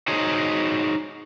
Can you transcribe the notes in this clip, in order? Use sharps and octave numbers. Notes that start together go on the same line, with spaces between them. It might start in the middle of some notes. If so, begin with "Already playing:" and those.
D#4 F#4 G#4 C5 C#5 D#5